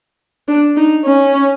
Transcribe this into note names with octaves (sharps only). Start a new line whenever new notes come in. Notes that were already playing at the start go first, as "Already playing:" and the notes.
D4
D#4
C#4